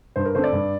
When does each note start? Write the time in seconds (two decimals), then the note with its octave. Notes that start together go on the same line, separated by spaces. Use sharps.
0.16 G2 C5
0.25 A#4
0.35 D3 A3 C4 C5
0.44 D5
0.53 G2